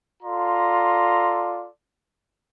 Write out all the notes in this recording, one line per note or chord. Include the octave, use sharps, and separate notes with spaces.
F4 A4 D5 A#5 C6